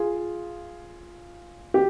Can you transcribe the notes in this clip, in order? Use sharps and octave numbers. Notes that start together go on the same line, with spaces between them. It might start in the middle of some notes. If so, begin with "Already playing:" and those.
Already playing: F4 G#4
G4